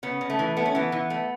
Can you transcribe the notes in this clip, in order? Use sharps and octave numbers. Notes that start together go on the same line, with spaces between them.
C#3 B3
C#3
A3
E3
A3 B3
C#4
E3 B3
E3
A3